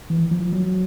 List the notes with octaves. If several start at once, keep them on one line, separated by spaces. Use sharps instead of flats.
E3
F3
F#3